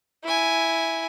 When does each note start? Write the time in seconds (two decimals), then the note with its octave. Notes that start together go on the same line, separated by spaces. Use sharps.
0.24 E4 G#5